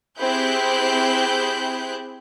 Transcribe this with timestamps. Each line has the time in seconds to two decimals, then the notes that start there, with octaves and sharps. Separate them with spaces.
0.19 C4 E4 G4 G#4 F#6 G6